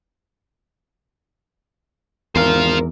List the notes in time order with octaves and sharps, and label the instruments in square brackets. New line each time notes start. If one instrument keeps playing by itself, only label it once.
[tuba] G#1 [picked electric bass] E2 [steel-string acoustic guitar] A#4 [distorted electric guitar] C5 F5